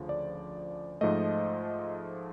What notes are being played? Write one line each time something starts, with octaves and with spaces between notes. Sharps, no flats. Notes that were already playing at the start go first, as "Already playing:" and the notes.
Already playing: D2 C#3 F3
D5
G#2 F3 A3 D#5